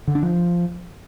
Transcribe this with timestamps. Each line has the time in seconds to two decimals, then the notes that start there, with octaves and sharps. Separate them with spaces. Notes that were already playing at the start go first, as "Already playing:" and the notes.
0.08 D3
0.15 D4
0.23 F3